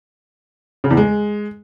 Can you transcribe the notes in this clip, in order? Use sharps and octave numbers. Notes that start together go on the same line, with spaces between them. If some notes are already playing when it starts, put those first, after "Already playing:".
C#3
E2
G#3